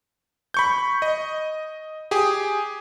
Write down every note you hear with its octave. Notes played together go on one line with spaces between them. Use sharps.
B5 C#6 G6
D#5
G4 G#4 G#5